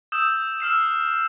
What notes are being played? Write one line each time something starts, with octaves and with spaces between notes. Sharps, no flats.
D#6 E6 G6 E7
E6 F6 C7 E7